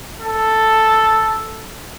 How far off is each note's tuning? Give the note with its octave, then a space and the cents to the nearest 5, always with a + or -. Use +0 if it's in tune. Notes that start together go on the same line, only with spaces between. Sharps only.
A4 +0